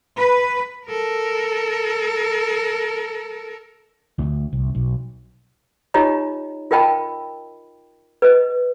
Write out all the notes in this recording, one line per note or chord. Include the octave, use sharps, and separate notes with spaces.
B4
A4 A#4
D2
C2
B1
D#4 F4 G4 C#5 D#5 A#5
F4 A#4 D#5 G5 A5 B5
B4 D#5